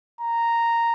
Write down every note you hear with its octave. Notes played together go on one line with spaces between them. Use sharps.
A#5